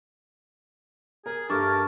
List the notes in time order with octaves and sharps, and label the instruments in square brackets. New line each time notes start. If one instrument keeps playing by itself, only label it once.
[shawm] G#4 [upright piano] A#4
[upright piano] G2 [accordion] A3 A#4 [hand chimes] D4 C#6 D6 [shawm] A5